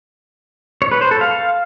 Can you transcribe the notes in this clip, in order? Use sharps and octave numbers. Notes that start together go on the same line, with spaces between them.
C#5
B4
C5
A4
F5